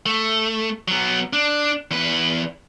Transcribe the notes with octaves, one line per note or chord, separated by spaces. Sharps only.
A3
F#3 B3
D4
E2 B4